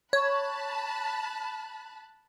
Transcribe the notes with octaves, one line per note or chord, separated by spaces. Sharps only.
C#5 A5 B5 F#6